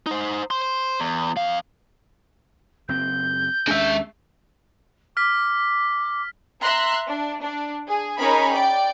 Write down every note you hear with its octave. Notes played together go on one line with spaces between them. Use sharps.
D#4 C5
C5 C6
E2
F2 F5
F#1 C4 G6
D#2 G#3 C#4 D4 E5
D6 F6 B6
E5 A#5 C6 F#6
D4
D4
G#4
C#4 D#4 G#4 A#4 A#5 B5
D5 G5